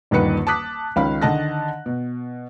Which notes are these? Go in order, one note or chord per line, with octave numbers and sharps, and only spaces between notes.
D#1 G2 D3 D#3 B4 C#7
A5 D6 D#6 F#6 B6
C#2 D#3 C#4 F5 B5
D3 D#3 D#5 A5 F#6 A#6
B2